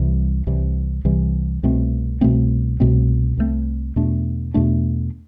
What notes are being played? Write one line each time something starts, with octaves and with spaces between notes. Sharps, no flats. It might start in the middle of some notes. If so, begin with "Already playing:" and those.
Already playing: C2 C3 E3 G3
C2 C3 E3 G3
C2 C3 E3 G3
C2 B2 A3 C4
C2 B2 A3 C4
C2 B2 A3 C4
C2 B2 A3 C4
E2 B2 A3 D4
E2 B2 A3 D4